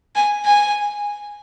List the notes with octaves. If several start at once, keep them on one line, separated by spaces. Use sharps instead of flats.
G#5
G#5